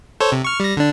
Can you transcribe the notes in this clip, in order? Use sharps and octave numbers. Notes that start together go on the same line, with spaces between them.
A4 C5 C#5
C3
C#6 F6
G3 A#6
D3 D4